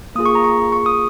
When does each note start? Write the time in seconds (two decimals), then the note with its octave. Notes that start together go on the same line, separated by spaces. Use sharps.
0.15 A#3 F4 G#4 D#6
0.26 C#6
0.35 A#5
0.44 C#6
0.72 C#6
0.86 D#6